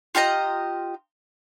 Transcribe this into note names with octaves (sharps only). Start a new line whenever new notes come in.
F4 G4 D#5 A#5